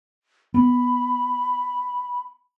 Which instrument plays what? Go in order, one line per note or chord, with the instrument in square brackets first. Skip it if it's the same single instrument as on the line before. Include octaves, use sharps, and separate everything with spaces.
[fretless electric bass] B3 [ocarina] B5